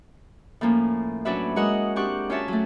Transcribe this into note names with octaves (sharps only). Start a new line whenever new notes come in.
A2 F3 A#3 C#4
F#3 C#4 D4 F#4 B4 E5
G#3 F#4 A#4 C#5 D#5 F#5
C4 D4 G4 F#5 C#6 F#6
C#4 F4 F#4 C#5 E5 A5
F#3 A3